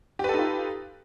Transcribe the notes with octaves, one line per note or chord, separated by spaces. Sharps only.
D#4 F4 G4 A4 B4